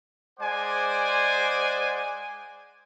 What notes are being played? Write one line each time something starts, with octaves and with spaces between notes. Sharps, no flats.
G#3 C5 D5 F#5 G#5 D6